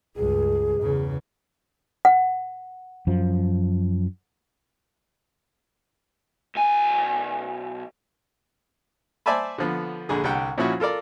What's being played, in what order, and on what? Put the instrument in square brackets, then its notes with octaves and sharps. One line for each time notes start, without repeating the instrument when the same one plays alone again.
[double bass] C#2 G2 [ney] G#4
[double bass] E2 C#3
[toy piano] F#5
[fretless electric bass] F#2 F3
[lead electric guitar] B1 G#5
[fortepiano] C5 D5 E5 G#5 A5 B5
D3 F3 B3
A#1 D3 G#4
C2 D3 G3 F#5 G5
A#2 F3 C#4 E4 F#4
F4 A4 A#4 D5